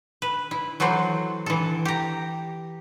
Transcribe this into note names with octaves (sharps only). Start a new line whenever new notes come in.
B4
E4
E3 F#3 F#4 A4 C5
E3 A4
G4 A#5